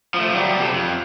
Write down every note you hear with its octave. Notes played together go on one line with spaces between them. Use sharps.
F3 A3
F#3 G3
C3 A4
F2